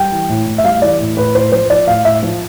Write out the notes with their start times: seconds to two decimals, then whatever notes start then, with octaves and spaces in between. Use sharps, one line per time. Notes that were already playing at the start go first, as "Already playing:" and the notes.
Already playing: G3 G5
0.11 E3
0.29 A2
0.47 A2
0.58 E5
0.64 G3 F5
0.82 E3 D5
1.00 A2
1.17 A2 B4
1.35 A2 C5
1.52 F3 C5
1.70 F3 D5
1.88 A2 F5
2.05 A2 E5
2.23 F3